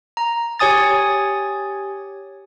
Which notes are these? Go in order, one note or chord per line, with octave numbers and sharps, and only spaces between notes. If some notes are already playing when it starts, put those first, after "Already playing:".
A#5
G4 C#5 G#5 D#6 A6